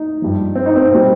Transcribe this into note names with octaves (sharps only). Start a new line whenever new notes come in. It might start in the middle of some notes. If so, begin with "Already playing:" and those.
Already playing: D#4
G2 F3
C4
D#4
C4
A#2 G3 C4